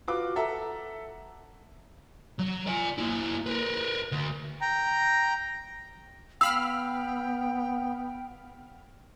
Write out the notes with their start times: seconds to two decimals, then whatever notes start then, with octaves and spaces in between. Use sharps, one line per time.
0.08 F4 F#4 B4 D6
0.36 A4 E5 F#5 A#5
2.39 F#3
2.67 D5 G#5
2.98 A#3 E4
3.46 A#4 B4
4.12 D2
4.61 G5 A#5
6.41 B3 F5 G5 B5 E6 F6